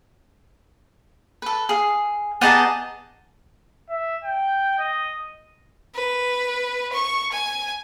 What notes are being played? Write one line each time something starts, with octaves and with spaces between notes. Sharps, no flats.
A4 B4
G#4 F5
B3 G4 G#4 D#5 A5 A#5
E5
G5
D#5
B4
C#6
G#5